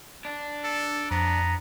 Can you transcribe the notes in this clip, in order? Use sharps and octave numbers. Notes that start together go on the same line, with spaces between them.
D4
A4
F2 B3 A#5